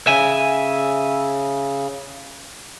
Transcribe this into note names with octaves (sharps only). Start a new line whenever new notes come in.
C#3 E5 G#5